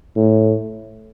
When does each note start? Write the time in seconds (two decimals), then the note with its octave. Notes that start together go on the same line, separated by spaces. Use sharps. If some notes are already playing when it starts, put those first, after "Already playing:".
0.16 A2